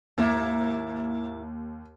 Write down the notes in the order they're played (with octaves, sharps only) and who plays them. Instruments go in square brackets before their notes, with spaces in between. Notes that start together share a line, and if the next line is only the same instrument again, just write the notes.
[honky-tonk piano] D#2 [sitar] G#2 A#3 E4